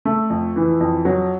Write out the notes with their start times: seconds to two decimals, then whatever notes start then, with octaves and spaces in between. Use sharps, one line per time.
0.05 A3
0.30 F2
0.56 E3
0.81 F2
1.05 F#3